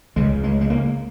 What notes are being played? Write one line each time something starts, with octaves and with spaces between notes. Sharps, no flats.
C#2 C#3 G#3
G#3
G#3
A#3